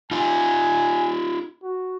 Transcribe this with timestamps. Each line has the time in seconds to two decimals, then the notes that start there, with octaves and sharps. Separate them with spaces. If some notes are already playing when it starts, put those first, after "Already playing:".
0.11 D#4 F4 G#5
1.63 F#4